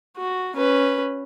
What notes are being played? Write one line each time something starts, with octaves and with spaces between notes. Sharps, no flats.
F#4
C#4 B4